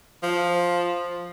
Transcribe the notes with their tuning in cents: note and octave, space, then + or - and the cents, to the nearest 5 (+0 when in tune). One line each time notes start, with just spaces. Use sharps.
F3 +5